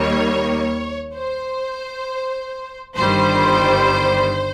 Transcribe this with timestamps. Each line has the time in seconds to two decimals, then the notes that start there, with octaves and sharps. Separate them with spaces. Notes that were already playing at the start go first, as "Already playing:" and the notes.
Already playing: D#2 D#3 G3 A#3 C#5
1.14 C5
2.96 G1 G2 D#3 G3 C5